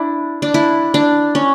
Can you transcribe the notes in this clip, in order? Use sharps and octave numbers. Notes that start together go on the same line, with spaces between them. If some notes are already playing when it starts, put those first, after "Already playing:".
Already playing: D4 E4
D4
E4
D4
C#4